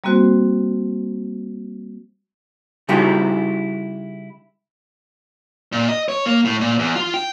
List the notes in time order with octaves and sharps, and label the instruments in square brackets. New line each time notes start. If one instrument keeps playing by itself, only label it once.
[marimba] G3 A#3 C4 F#4 C5
[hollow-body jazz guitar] C#3 G3 D#4 E4 F#4 G4
[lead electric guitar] A#2
D#5
C#5
A#3
A2
A#2
E2
F4
G5